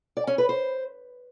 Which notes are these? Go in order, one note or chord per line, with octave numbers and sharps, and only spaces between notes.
D5
C#4
B4
C5